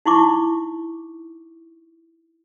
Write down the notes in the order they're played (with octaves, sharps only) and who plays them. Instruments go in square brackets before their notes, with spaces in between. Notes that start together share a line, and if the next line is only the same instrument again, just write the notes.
[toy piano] D#4 E4 C#6 D6